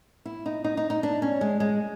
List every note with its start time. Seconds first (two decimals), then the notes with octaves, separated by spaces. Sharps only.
0.25 E4
0.46 D#4
0.64 D#4
0.77 D#4
0.90 D#4
1.03 D4
1.22 C#4
1.41 G#3
1.60 G#3